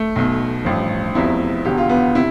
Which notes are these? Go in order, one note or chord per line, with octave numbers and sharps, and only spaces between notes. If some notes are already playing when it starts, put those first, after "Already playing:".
Already playing: A3
B1 B2
A1 G2 F3
F1 E2 C3 F3 E4
E1 E2 D3 G4
F4
B3
C3 E4